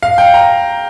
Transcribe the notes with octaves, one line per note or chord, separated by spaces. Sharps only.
F5
G5
A#5